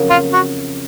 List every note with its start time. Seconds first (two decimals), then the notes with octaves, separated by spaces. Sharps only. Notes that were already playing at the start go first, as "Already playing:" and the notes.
Already playing: F2 C#3 F#3 A#3
0.10 F4
0.33 F#4